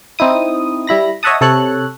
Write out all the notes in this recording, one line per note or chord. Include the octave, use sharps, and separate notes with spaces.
C4 D#4 E4 D#6
G3 E4 B5 A#6
C#5 D#5 E5 F#5 A5 D#6
C3 A4 C#5 F#6